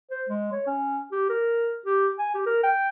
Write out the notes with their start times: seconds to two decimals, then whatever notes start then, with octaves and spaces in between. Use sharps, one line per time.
0.11 C5
0.29 G#3
0.52 C#5
0.67 C#4
1.12 G4
1.29 A#4
1.86 G4
2.19 G#5
2.34 G4
2.46 A#4
2.63 G5